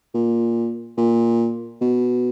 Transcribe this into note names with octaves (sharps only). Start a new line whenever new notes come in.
A#2
A#2
B2